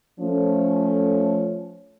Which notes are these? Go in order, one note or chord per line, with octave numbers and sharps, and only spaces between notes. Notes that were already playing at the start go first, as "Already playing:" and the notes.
F3 A3 C#4